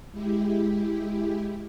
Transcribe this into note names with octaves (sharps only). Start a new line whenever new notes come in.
G#3 E4 G4